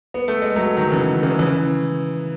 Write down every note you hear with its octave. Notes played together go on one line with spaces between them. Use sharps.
B3
A3
G#3
F#3 A3
D#3 F#3
C#3 E3
C#3 E3
C#3 E3